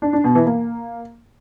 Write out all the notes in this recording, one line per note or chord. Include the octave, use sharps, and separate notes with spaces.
D4
D4
B2
E3
A#3